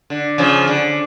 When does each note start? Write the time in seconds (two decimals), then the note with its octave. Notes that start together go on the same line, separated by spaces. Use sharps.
0.10 D3
0.38 C#3 F3
0.67 D3